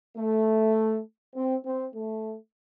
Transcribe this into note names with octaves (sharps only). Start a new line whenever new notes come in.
A3
C4
C4
A3